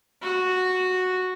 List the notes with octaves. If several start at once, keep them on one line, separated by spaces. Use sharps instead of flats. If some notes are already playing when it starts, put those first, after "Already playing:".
F#4